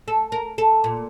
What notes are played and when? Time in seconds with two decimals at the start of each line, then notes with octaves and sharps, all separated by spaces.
0.08 A4
0.32 A#4
0.58 A4
0.84 A#2